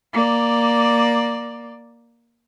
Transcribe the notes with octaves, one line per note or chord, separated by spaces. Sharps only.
A#3 D5